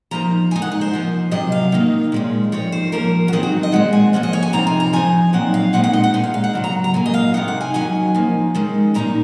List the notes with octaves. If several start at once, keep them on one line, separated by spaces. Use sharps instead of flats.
F3 A#3 D#4 A#5
C#3 G#3 D#4 G#5
F#5
D#5
C5
C3 F3 A#3 D#4
C3 F#3 C#4 D#5
F5
D#3 A#3 D#4
A#2 G#3 C#4
F3 C4 D#4 C#5
C5
F3 A#3 C#4 A#4
F#4
D#3 F#3 C4 D#4 G#4
F#4
D#5
A#2 G#3 C4 F#5
G#5
F3 A#3 C#4 F#5
D#5
C#5
G#5
C3 F3 C4 D#4 A#5
G#5
A#5
F3 C4 D#4 G#5
A#2 F#3 C4 D#4 F#5
F5
A#2 G#3 C4 D#4 F#5
F#5
D#5
F#5
A#2 G#3 D#4 G#5
F5
F5
F#5
C#3 F#3 C4
A#5
A#5
A#2 F#3 A#3 G#5
D#5
F5
C3 D#3 A#3 D#4 F#5
F#5
G#5
D#3 F#3 C#4 G#5
F3 A#3 D#4
D#3 G#3 C#4
A#2 F#3 A#3 D#4 A#5